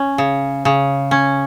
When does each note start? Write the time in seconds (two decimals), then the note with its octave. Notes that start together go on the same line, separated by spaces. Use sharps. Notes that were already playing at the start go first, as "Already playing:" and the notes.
Already playing: C#4
0.18 C#3
0.65 C#3
1.11 C#4